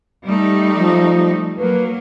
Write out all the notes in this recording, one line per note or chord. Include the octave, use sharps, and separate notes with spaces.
G3 A3 D#4
F3
F#3 A#3 B4